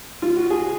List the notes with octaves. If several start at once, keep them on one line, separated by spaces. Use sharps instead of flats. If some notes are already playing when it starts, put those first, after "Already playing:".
F4
F#4
G#4